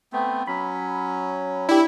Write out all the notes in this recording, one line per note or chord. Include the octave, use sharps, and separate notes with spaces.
A3 B3 C4
F#3 C#4 B5
D4 E4 G4